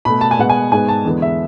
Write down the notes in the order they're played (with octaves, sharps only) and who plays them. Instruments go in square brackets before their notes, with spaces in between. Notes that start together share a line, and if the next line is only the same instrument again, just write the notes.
[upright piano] B2 A3 B5
A5
G#5
B2 G#3 B3 F#5
G#5
G#2 G#3 B3 G#5
A5
E2 D3 G#3 B3
E5